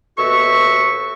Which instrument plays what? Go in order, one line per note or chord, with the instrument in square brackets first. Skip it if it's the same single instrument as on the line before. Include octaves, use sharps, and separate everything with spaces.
[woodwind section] D#2 B2 F#4 A4 E5 C#6